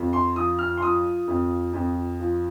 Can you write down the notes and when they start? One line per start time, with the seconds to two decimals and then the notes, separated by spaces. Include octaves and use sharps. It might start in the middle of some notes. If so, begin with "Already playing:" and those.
Already playing: F2
0.13 C6
0.35 F3 D#6
0.59 F6
0.77 C6
0.81 F3 D#6
1.27 F2
1.73 F2
2.20 F3